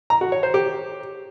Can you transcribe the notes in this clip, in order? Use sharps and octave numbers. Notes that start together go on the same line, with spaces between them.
A#5
F#4
C#5
C5
G4